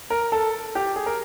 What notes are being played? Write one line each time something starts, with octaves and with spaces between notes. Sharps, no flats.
A#4
A4
G4
G#4
A#4